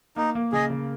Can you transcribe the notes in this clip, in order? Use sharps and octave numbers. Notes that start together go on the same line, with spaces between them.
A#3 D#4
A#3
C#3 G#4 D#5
C#3